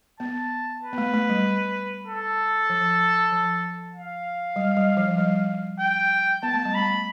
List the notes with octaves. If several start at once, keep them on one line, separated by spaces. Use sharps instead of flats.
B3 A5
B4
B3
A3
A3
G3
A4
F3
F3
F5
G3
G3
F3
G3
G5
B3 A5
A3
G3
A3 B5